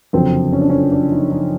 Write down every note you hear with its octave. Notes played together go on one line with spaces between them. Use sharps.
F#1 F2 D3 F#3 C4
C#4
D4
C#4
D4
D#4
D#4